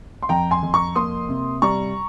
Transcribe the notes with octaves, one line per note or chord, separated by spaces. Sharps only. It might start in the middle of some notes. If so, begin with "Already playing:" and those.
C6
F2 G5 A#5
G#5 C6
F2
A#5 C#6
A#3 C6 D#6
C3
G3 A#5 C#6